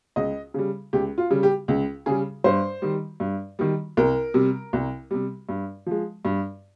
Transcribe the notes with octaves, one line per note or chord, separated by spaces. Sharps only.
C#2 D#5
C#3 G3
C#2 G4
F4
C#3 G3
G4
C#2
C#3 G3 G#4
G2 C5
D#3 G3
G2
D#3 G3
C2 A#4
C3 G3
C2
C3 G3
G2
F3 G#3
G2